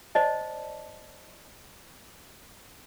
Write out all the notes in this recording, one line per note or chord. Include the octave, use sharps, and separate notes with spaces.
C5 D5 D#5 A5